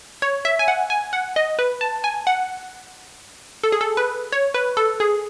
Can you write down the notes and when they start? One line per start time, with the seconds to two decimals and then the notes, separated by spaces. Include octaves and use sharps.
0.22 C#5
0.45 E5
0.59 G#5
0.68 F#5
0.90 G#5
1.13 F#5
1.36 D#5
1.59 B4
1.81 A5
2.04 G#5
2.27 F#5
3.64 A4
3.72 G#4
3.81 A4
3.97 B4
4.32 C#5
4.54 B4
4.77 A4
5.00 G#4